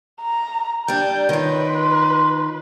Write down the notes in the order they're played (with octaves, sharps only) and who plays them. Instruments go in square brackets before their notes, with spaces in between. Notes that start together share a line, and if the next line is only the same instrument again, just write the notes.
[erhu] A#5
[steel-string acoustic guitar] G3 D4 [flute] G5 [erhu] G6
[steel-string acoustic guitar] D#3 F4 [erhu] B4 [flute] C#5
[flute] C6